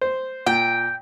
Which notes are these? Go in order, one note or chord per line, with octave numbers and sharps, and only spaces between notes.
C5
A#2 G5